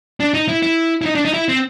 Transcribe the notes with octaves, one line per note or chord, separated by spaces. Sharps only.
D4
D#4
E4
E4
E4
D#4
D4
D#4
E4
C4